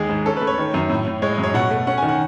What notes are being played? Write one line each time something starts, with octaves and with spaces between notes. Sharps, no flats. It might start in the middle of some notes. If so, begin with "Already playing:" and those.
Already playing: D#2 G#3 G#4
G#2
C#4 A4
B4
A3
C#5
D#3
F#2
A2
A2
G#3 C#5
D#5
F#2
C#5
B2 F#5
A3
C#4 F#5
G#5
D#3
F#5